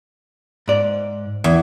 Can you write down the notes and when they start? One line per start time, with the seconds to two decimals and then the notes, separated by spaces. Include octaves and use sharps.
0.68 G#2 D5
1.44 E2